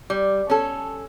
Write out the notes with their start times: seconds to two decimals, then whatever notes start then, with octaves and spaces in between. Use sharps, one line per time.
0.10 G3
0.50 C#4 A4